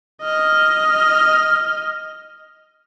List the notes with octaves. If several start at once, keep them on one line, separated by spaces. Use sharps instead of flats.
D#5 F6